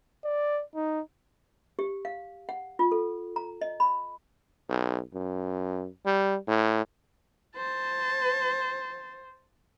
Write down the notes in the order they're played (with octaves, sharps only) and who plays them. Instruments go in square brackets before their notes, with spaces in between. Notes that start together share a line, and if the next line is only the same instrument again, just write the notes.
[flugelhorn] D5
D#4
[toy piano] G4
F5
F#5
F4
A4
A#5
D#5
B5
[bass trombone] B1
F#2
G3
A2
[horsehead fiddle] C5 [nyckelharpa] A5